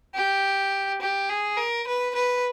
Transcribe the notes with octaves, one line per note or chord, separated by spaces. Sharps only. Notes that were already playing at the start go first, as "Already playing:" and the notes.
G4
G4
G#4
A#4
B4
B4